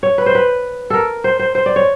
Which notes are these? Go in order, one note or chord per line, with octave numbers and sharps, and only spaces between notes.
C#5
B4
C5
B4
A4 A#4
C5
C5
C5
D5
C#5